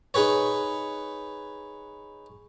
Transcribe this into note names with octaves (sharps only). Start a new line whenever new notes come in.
D#4 G#4 B4 C#5